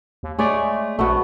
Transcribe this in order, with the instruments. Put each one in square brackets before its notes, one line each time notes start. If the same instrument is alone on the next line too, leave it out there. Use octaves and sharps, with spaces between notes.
[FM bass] D#2
[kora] G#3 C#5 D5 [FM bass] A3
[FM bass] A#1 [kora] A3 B3 F#4